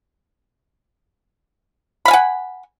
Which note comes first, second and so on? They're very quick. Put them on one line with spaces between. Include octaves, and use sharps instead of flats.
B5 F5 G#5 F#5